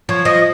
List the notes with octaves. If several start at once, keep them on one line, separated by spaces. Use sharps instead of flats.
F3 C#5
F3 D#5